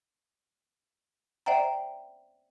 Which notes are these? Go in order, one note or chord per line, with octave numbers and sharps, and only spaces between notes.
C5 D5 E5 F#5 G5 A#5